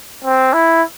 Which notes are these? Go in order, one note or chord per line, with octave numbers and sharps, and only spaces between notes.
C4
E4